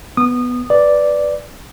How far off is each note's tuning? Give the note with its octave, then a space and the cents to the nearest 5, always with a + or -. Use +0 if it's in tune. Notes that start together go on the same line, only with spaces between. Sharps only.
B3 +0 D#6 -25
B4 +0 D5 +0